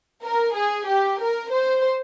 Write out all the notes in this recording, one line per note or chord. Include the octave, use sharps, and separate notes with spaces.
A#4
G#4
G4
A#4
C5